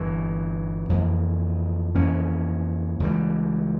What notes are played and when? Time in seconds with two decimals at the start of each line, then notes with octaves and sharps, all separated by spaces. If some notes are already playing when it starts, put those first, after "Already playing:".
Already playing: G1 G2 E3
0.90 F2 E3 A#3
1.94 F2 E3 A#3 C#4
3.00 C#2 C#3 E3 G3